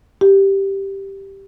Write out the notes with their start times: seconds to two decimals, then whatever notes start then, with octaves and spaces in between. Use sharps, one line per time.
0.21 G4